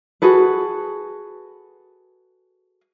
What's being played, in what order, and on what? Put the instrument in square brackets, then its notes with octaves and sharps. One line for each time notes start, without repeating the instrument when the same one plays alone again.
[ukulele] F#4 G#4 A4 B4